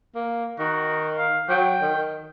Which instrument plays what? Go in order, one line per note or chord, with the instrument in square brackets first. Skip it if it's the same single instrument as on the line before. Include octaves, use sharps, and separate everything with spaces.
[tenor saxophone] A#3
[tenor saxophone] D#3 [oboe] F#4
[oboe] F5
[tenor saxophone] F#3 [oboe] G5
[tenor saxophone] D#3